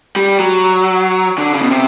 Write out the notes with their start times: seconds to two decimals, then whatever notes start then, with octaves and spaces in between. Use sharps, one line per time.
0.16 G3
0.40 F#3
1.38 D3
1.54 C#3
1.62 B2
1.70 C3